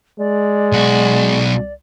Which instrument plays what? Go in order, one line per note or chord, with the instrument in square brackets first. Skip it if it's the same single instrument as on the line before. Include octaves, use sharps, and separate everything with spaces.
[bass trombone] G#3 [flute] D5
[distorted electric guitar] B1 F#4